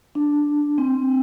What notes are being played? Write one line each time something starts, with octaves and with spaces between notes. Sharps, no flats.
D4
C4